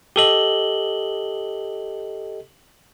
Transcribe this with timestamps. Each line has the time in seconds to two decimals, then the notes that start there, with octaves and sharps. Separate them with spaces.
0.16 G4 A4 D#5 F#7 G7